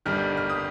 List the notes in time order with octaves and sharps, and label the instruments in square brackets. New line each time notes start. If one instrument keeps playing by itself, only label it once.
[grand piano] G1 G2 D#3 G3 F6
F6
D#6